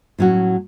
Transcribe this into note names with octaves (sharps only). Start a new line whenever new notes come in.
A2 F#3 C#4 F#4